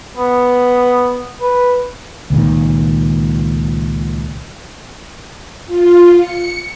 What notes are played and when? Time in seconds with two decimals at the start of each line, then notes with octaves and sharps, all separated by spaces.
0.17 B3
1.41 B4
2.30 C#2 A#2 D#3
5.66 F4
6.17 C#7